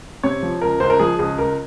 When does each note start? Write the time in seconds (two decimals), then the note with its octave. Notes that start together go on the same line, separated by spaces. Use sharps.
0.23 C3 C#5
0.42 F3
0.62 C#2 A#4
0.80 C#2 C5
0.90 A#4
0.99 F3 G#4
1.19 C#2 G#4
1.38 C#2 A#4